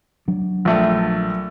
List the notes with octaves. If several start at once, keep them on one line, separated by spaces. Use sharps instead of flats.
F#3 D4
A#1 A3